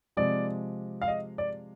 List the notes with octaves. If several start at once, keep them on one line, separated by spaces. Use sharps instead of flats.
C3 F3 G#3 D5
F5
D#5
D5